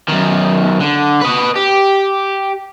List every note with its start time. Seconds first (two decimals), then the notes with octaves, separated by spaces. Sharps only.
0.08 F#2 D#3
0.81 D3
1.22 B4 D#5
1.56 G4